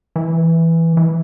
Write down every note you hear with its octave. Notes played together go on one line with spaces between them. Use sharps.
E3
E3